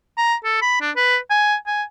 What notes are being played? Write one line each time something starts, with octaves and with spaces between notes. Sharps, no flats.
A#5
A4
B5
D4
B4
G#5
G#5